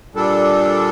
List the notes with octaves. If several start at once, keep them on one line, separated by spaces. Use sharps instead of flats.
A#2 G3 D4 A4